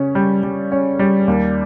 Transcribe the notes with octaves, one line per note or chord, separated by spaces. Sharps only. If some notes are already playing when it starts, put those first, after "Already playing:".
Already playing: C#3 C#4
G3
G3
C#4
G3
D#2